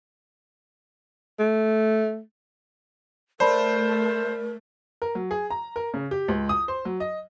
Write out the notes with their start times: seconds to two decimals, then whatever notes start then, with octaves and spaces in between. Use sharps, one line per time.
1.39 A3
3.40 A3 A#4 C5 D5 A5 B5
5.02 A#4
5.15 F#3
5.31 G#4
5.50 A#5
5.76 A#4
5.94 C#3
6.11 G4
6.28 C#2
6.49 D#6
6.68 C5
6.85 F#3
7.00 D#5